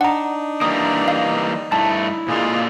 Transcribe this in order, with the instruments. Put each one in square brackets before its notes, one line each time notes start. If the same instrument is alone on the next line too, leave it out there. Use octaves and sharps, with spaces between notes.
[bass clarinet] D4 [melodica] D#4 [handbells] F#5 A#5
[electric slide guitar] E3 G3 A#3 [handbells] D#6
[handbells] F5
[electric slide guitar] G2 A3 [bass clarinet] E4 [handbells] A5
[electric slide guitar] A#2 D3 F4 [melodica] G#3 A#3 G#4